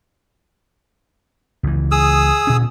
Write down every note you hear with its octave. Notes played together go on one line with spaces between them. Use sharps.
C#2 E3
G#4 D#6 E6
D2 A#2 C#4